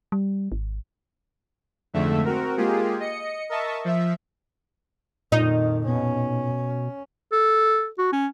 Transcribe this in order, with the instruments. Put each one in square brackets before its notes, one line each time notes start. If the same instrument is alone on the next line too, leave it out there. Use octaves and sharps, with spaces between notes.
[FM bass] G3
G#1
[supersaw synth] F2 G#2 D3 A3 E5
C4 F#4 A#4
G#3 A#3 F4 G4 G#4
D#5 C#7
A#4 D#5 E5 A5 C#6
F3 E5
[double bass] F2 D#3 [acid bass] A#2 [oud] D#4
[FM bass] B2 [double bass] C#4
[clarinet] A4
F#4
C#4